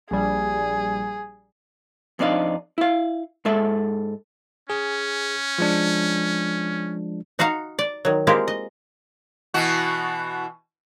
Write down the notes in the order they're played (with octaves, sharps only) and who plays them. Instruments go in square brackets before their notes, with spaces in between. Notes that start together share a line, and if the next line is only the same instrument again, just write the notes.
[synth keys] A#1 G3 [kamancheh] G#4
[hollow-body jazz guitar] F2 C4 D4 D#4 F5
E4 F5
G#2 G#3 A4 E5
[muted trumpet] C#4 [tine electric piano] G#4
[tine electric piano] F3 G#3 D4
[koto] D#4 F#4 F5 F#5 A#5
D5
D#3 F#3
G#3 A#3 C4 E4 F4 G4
D#5
[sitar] B2 E3 F#4